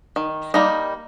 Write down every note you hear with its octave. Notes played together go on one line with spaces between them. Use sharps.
D#3
G3 A#3 D#4